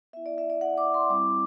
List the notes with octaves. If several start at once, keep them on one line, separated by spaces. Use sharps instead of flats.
B3 E4 E5
D5
E5
D5
F#5
D6
C6
G3 C4 E4 D6